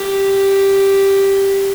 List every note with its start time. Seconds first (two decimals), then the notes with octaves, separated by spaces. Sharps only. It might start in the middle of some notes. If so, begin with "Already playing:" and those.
Already playing: G4